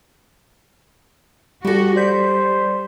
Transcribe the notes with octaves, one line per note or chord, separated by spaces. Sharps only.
G3 F#4 G4 A4 A#6
G3 C5 D5 G6 B6